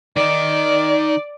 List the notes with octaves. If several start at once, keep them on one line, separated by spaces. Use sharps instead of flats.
D#3 D#4 D5